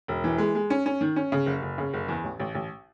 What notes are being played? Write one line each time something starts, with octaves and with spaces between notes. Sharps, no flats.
E1
E3
G#3
G#3
C#4
C#4
D#3
C#4
C#3
F#1
F#1
C#3
F#1
E2
A1
A1
A1